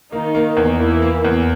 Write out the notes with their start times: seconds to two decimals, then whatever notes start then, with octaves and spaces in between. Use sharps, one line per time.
0.12 D#3 A#3 D#4
0.35 A#3
0.57 E2
0.79 E3 A#3 E4
1.02 A#3
1.25 E2